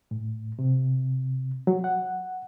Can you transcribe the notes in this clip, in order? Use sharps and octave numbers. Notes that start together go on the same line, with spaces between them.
A2
C3
F#3
F#5